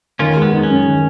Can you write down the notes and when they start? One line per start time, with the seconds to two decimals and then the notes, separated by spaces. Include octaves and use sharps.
0.19 D#3 C#4 F4
0.36 G#3
0.42 B3
0.52 D#4
0.63 C#4
0.69 F#2
0.86 D#3